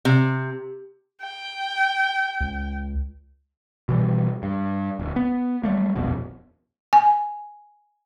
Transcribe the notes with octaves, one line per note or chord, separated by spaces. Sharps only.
C3
G5
C#2
B2 E3 G3
G2
D1
B3
F#3 G3 A3 A#3
D#1 A#1 F2 B2
G#5